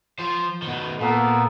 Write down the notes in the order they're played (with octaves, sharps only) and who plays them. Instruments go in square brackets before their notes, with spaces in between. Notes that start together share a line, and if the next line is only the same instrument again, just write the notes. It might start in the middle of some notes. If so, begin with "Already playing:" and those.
[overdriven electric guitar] F3 C5
B2 D#3
[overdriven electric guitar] A#2 [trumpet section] A#3 B3 A4